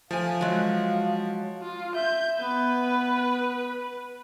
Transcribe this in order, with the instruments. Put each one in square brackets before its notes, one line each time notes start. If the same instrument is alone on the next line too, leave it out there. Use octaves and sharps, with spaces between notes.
[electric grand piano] F3 [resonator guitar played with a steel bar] A3 G#5 [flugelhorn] F5
[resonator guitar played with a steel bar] F#3 G#3
[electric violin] F4
[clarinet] E5 [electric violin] G6
[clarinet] B3 [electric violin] B4